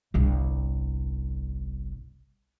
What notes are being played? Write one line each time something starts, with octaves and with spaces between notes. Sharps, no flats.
G1 C2